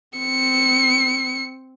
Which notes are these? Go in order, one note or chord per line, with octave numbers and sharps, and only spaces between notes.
C4 C#7